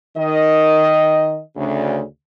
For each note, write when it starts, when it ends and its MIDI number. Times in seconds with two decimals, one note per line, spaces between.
0.17 1.40 51
0.17 1.40 75
1.57 2.01 38
1.57 2.01 49